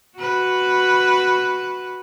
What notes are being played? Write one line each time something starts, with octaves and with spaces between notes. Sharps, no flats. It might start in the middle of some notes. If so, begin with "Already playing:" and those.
F#4 B4